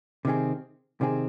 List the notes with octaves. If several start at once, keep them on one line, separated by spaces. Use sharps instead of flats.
C3 D#3 C4 G#4
C3 D#3 C4 G#4